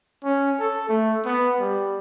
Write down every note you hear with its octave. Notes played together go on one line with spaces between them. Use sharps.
C#4
A4
A3
B3
G3